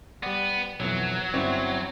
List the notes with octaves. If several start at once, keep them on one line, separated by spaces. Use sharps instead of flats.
G3 B3 D5
B1 F2 E3 F#3
G1 C4 C#4 E4 F#4 D5